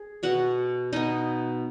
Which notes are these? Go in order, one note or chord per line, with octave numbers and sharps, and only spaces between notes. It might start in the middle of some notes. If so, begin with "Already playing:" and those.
Already playing: G#4
B2 B3 F#4 F#5
B2 B3 D#4 D#5